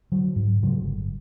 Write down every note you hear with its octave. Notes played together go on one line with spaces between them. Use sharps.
D3 F#3
G#2
A2 C#3 F#3 G#3
G1